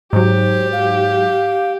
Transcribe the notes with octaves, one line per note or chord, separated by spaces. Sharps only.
G#2 F#3 G4 C5
F5